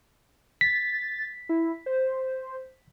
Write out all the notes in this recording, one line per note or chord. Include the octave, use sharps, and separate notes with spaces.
A6 B6
E4
C5